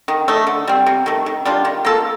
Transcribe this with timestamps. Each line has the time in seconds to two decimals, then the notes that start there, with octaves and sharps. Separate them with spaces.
0.08 D#3
0.28 A3 D#4
0.47 D3
0.67 G3 C4
0.86 C3
1.06 D#3 A3
1.26 D#3
1.45 G3 D4 F4
1.65 D#3
1.85 A#3 F4 A4